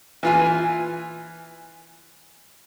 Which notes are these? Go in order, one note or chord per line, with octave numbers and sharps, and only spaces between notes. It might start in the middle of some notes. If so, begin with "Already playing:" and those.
E3 F4 G#5